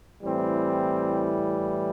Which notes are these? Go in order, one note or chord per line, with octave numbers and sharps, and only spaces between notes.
A2 E3 G3 C4